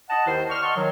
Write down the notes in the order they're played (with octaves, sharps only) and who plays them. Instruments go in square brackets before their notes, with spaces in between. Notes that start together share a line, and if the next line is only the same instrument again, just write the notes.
[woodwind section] D#5 F#5 A5
D#2 D#3 E4 C5
D5 C6 C#6 F6
D#5 F#5 A5 C6 C#6
D#3 F#3